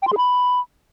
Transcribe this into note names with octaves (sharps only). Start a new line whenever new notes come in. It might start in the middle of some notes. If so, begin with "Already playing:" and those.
G5
C6
G#4
B5